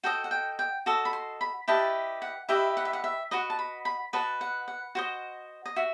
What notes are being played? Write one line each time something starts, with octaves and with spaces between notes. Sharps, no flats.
F#4 A4 D#5 G5
F#5
G5
G5
F#4 A4 D#5
B5
C6
B5
E4 G4 B4 D#5 A5
F#5
E4 G4 B4 D#5 E5
F#5
E5
F#5
E5
F#4 B4 D#5 F#5
A5
B5
B5
F#4 B4 D#5 A5
F#5
F#5
F#4 C5 D#5
D#5
F#4 E5